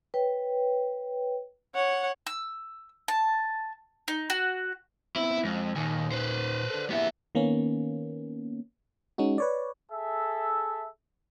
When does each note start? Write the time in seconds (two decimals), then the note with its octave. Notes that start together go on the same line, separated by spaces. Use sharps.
0.14 B4 C#5 G5
1.75 C#5 F#5
2.27 E6
3.08 A5
4.08 D#4
4.30 F#4
5.16 B3 C4 E4
5.45 F2 G#3
5.76 D#2 A#2 D#4 G#5
6.12 B4 C5
6.70 A4 D5
6.90 A#3 B3 E4 G4 E5
7.35 D#3 A#3 B3 C#4
9.18 G#3 C#4 D#4 F#4
9.38 B4 C#5 D5
9.91 G#4 A4 E5